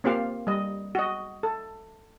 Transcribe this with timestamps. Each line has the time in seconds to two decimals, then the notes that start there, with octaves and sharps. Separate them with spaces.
0.04 A#3 C4 F4 G4 F5
0.47 G3 D#5
0.95 F#4 D#5
1.43 A4